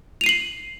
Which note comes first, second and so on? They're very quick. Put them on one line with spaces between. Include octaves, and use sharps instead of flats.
F7 D#7 C7 F#7